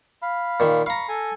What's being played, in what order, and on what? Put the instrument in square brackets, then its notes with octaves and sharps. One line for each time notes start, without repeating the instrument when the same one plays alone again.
[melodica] F5 B5
[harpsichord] A#2 D#3
[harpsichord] F5 A#5 [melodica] B5 C#6
[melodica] A4 G#5